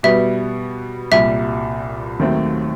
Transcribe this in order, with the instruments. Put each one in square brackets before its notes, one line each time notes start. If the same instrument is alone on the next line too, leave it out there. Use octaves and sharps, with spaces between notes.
[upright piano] B2 G3 B3 [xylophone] E5
[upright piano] C2 A#2 G3 [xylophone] E5
[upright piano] D#2 D#3 F#3 A3 C4